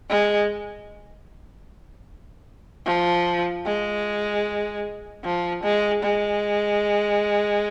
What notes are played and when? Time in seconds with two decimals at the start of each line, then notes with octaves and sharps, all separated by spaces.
0.10 G#3
2.86 F3
3.66 G#3
5.25 F3
5.64 G#3
6.03 G#3